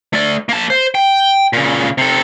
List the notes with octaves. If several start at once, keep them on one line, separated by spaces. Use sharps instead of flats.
A3 D5
A#3 A5
C5
G5
A#2 C#3
C3 A4